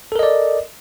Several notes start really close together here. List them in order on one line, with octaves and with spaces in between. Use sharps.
A4 A#4 D#5 D5